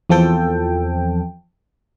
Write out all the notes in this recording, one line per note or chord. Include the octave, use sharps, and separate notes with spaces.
E2 F3 C4 A4 G5